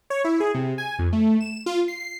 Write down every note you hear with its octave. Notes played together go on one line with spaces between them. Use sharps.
C#5
E4
G#4
C3
G#5
F2
A3
E7
F4
C7
C7